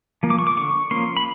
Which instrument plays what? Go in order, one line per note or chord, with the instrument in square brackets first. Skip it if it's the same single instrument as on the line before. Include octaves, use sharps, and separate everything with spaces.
[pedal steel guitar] F3 A#3
D6
C#6
D6
D3 C#6
F3 A#3 C#4 C6
B5